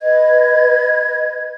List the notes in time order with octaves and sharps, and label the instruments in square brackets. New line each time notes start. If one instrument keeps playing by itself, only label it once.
[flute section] B4 D#5 G#6